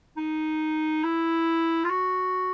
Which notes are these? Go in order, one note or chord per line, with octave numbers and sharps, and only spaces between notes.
D#4
E4
F4
F#4